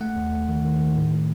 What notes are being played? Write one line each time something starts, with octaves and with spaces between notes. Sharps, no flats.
A3 F#5
D#2
A3
D#3
D#3
D#3
A2
A2